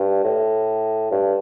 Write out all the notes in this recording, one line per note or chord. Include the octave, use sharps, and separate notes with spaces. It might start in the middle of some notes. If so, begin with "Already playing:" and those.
Already playing: G2
A2
G2